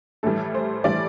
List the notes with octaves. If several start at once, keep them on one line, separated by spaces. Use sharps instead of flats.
A2 E3 G3 A4
C5
A2 E3 G3 D5